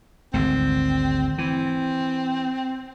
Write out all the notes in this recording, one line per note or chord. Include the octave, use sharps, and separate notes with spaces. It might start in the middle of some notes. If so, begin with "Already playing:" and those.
G#1 D2 C4
E3 C4